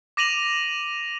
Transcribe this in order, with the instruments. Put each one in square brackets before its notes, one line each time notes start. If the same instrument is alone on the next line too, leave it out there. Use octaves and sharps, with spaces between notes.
[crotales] D6 A#6 D#7 F7 F#7